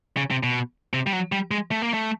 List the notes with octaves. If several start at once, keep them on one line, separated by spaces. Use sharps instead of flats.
C#3
C3
B2
C3
G3
F#3
G3
G#3
A3
A#3
A3